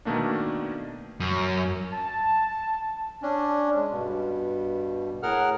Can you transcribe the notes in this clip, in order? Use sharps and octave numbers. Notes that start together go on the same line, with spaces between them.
B2 D#3 A3 A#3 D4
F#2
A5
C#4 D4
G#3
G2 B2
A2 G#4 A#4 F#5 F6